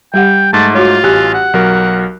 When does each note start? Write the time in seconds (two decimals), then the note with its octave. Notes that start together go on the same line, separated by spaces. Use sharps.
0.14 G3 G4 F#5 G5
0.53 G#2 A3 A5
0.75 F4 F#4 C#5
1.03 A1 G4 G#5 F#6
1.34 F#5
1.53 B1 F#3 A#4